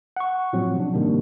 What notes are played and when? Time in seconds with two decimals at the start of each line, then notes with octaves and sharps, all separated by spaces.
0.17 F#5 C#6
0.53 A2 F3 F#3 C4
0.76 C3 D4
0.94 G#2 C3 D#3 G3 A#3 D4